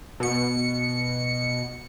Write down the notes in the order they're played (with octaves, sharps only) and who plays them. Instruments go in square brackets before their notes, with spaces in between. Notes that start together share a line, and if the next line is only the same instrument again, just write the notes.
[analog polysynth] B2 C#7